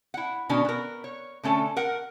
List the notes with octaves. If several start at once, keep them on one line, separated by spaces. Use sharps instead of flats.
E4 F#5
B2 D3 D#3 C#4 D4
B3 A#4
C#5
D3 A3 C#4 A4
A#4 F#5